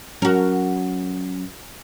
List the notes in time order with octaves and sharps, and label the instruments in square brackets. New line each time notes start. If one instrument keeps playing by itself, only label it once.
[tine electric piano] F#3 C#4 [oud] F#4 A#4